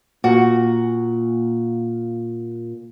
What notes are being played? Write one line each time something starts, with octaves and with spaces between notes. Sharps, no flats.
A#2 F#4